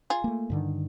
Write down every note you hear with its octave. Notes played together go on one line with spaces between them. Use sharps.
F4 G#4
A3 A#3
G2 D3 D#3